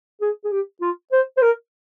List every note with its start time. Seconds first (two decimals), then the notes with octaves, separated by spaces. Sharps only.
0.21 G#4
0.44 G#4
0.52 G4
0.81 F4
1.12 C5
1.37 C5
1.42 A#4